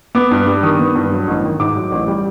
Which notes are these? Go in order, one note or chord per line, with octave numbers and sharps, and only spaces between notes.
B3 D6
G2
G3
D#3 D#6
B3
G2
F#3
A1
D#3
G#2 D6
F#3
A1
G3